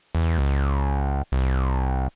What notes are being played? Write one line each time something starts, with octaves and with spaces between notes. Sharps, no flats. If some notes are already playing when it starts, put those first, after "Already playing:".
E2
C#2
C2